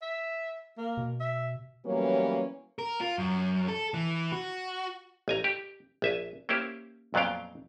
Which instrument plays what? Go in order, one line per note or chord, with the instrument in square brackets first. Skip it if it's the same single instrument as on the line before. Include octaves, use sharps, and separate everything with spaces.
[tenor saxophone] E5
A#3
[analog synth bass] B2
[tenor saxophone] E5
[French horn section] E3 F#3 G3 A#3 B3 C#4
[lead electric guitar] A#4
F4
F#2
A4
E3
F#4
[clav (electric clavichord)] A1 G#5 A#5
G4
A#1 E5 G#5
A#3 C#4 E4 G4 C5
F2 A#2 F#3 B3 F5 G5